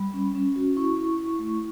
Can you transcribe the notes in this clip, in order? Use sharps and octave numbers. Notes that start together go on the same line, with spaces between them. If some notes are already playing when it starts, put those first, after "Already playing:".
Already playing: G3 B5
C#4
C#4
F#4
E4 C#6
E4
E4
A3